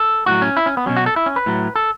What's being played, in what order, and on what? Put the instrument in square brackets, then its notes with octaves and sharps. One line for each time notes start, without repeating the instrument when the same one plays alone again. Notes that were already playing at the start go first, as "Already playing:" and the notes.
Already playing: [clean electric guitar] A4
A2 F#3 F#4
C#4
E4
C#4
B3
B2 F#3 C#4
F#4
A4
E4
C#4
B4
A2 F#3
A4